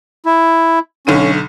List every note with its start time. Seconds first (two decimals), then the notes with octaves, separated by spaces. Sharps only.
0.26 E4
1.07 B1 D3 C#4 D#7